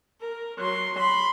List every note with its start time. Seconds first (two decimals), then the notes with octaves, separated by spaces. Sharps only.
0.21 A#4
0.58 F#3 C6
0.98 B5 C6